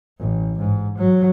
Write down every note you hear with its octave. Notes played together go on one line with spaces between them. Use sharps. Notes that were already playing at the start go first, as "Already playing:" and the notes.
A1
G#2
F#3